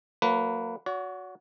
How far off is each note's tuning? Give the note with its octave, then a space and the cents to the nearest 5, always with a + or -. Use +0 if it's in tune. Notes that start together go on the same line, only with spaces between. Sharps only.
F#3 -25 A#3 -25 B4 +0
F#4 -10 C#5 +45